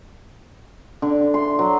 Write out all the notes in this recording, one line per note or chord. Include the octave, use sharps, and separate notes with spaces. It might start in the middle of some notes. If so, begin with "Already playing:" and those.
D3
C6
F#3